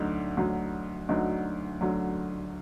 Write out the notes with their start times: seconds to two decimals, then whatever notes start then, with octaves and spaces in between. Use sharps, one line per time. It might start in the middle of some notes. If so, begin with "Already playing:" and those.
Already playing: D2 D3 F#3 D#4
0.37 D2 D3 F#3
1.09 D2 D3 F#3 D#4
1.81 D2 D3 F#3